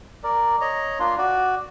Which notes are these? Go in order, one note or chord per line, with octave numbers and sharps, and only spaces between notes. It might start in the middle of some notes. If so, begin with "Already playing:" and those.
A#4 D5
C#5 D#5 A#5
A#3 D4 F4 C6
F#4 D5